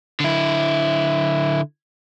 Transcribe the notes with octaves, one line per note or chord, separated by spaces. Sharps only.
D3 E4